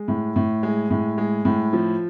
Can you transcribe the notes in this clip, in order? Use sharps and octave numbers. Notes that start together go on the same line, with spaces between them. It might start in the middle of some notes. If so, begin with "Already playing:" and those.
Already playing: G#3
A2
A2
G#3
A2
G#3
A2
F3